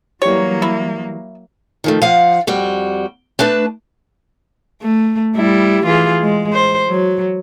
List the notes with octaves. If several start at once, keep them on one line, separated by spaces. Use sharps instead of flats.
E3 F#3 G3 A#3 C#5
E4
D#3 F3 A3
F3 F5 F#5
F2 G3 F#4
A3 D4 B4 A5
A3
G3 E4
E3 F4 G#4
G#3
C5
F#3